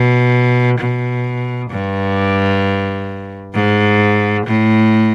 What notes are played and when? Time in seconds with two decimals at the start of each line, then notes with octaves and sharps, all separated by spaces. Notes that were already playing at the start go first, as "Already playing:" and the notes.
Already playing: B2
0.79 B2
1.70 G2
3.54 G#2
4.46 A2